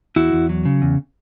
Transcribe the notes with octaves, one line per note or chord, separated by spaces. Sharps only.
E2 E4 F#4
E2
F#3
C#3
E2